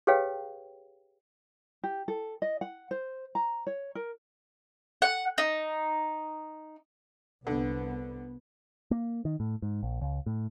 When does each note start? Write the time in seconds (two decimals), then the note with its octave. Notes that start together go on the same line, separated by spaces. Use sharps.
0.07 G4 G#4 B4 C#5 F5 G5
1.84 G4
2.08 A4
2.42 D#5
2.61 F#5
2.91 C5
3.35 A#5
3.67 C#5
3.95 A#4
5.02 F#5
5.38 D#4
7.47 C2 D3 B3
8.91 A#3
9.25 D#3
9.40 A2
9.62 G#2
9.83 A#1
10.01 C#2
10.26 A2